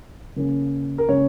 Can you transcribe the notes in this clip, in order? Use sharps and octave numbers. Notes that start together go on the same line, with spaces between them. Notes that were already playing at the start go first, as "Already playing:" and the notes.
C#3 A#3 C#4
A#4
C#3 A#3 C#4 C#5